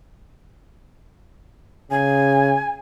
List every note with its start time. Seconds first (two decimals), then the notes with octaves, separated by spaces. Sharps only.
1.91 C#3 G#5